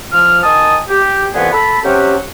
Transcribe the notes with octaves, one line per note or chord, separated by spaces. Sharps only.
F3 F6
D#3 G#5 A5 D#6
G4
C2 F2 E3 B3 G#4 F#5
A4 B5
C3 F#3 C#4 F#4 G4